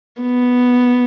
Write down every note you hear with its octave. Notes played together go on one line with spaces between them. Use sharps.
B3